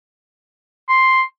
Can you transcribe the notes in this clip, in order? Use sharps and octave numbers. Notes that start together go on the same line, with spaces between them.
C6